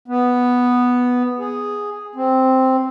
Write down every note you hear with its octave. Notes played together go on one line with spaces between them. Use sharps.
B3
G#4
C4